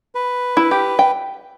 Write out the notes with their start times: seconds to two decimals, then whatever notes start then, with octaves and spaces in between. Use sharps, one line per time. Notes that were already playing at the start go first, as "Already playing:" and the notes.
0.15 B4
0.57 E4
0.71 G4
0.99 G5